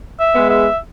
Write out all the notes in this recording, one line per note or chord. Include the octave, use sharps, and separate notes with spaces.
E5
G#3 B3
E5